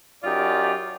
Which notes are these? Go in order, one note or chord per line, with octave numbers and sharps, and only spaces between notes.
F#2 D#4 F4 G4 D5